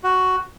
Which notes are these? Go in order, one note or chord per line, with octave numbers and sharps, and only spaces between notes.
F#4